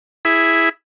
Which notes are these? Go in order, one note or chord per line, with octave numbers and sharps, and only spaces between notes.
E4 G#4 E5